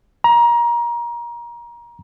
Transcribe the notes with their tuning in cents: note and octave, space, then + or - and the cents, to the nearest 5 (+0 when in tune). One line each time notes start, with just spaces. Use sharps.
A#5 +25